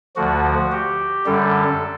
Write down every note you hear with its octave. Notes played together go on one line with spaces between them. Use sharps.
D2 D3 F3 F#4
G4
F#2 D3 G3 A4